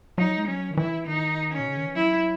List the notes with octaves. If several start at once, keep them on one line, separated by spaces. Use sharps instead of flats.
F#3 D#4
G#3
F#3 C#4
D#3
E3 E4
D#3 D#4
C#4
B2
C#3
D#3
E3
F#3 E4